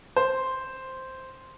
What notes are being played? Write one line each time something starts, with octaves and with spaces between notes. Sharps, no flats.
C5